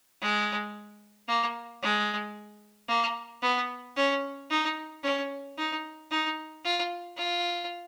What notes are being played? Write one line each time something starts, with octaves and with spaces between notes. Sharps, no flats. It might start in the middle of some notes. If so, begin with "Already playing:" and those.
G#3
A#3
G#3
A#3
B3
C#4
D#4
C#4
D#4
D#4
F4
F4